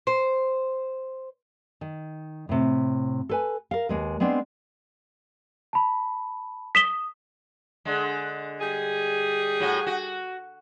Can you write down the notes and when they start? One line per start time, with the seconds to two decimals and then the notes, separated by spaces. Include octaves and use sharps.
0.07 C5
1.81 D#3
2.49 A2 C3
3.29 A4 B4 G#5
3.71 A#4 F5
3.89 D#2 G#3 B4
4.20 G#3 B3 C4 D4
5.73 A5 B5
6.75 D#6 B6 E7 G7
7.85 D3 G#3
8.60 G3 G#4
9.60 A2 F#4
9.86 F#4